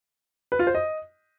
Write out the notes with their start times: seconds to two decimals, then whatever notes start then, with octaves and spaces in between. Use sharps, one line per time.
0.52 B4
0.59 F4
0.67 C5
0.74 D#5